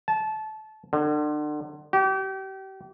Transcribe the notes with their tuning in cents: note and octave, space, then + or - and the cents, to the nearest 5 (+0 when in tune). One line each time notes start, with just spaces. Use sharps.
A5 -25
D3 +35
G4 -35